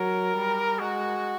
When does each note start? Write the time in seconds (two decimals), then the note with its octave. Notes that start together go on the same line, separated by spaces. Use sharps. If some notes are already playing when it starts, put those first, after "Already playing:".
Already playing: F#3 A#4
0.35 G3
0.79 G#3 F#4